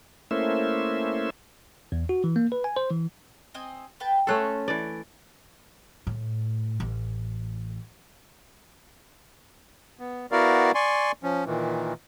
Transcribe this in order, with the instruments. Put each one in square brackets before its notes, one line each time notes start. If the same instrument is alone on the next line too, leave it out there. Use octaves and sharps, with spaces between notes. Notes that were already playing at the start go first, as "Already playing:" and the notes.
[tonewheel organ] A3 A#3 C#4 E4 C5 E5
[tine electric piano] E2
F#4
E3
A#3
B4
G#5
C5
E3
[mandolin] C4 D#5 G#5
B4 G5 A5
[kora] A3 C#4 A4 [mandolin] B5 C6 F#6
[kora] E3 D5
[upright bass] A2
A1
[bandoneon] B3
B3 E4 F#4 A#4 D5 F5
D5 G#5 C6 C#6
F3 C#4
A#2 D#3 E3